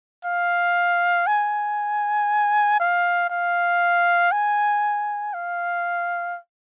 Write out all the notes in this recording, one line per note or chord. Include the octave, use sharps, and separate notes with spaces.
F5
G#5
F5
F5
G#5
F5